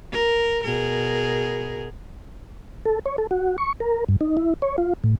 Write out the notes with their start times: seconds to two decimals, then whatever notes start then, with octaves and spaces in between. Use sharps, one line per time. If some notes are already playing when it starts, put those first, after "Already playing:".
0.12 A#4
0.63 B2 G#4 A#4
2.86 A4
3.06 C#5
3.18 A4
3.31 F#4
3.58 C#6
3.80 A#4
4.08 G2
4.21 D#4
4.37 E4
4.62 C#5
4.78 F4
5.04 A2